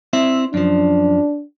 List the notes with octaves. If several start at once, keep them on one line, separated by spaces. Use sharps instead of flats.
C4 E4 E5
F#2 F3 D4